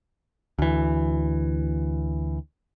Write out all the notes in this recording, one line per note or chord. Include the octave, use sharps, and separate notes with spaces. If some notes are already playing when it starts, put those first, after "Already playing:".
D2 E3